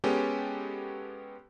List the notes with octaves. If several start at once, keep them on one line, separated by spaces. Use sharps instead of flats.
G#3 B3 C#4 G4 A4